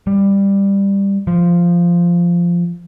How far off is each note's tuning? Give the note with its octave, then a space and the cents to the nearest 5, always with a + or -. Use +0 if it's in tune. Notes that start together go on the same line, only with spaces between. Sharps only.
G3 +10
F3 -10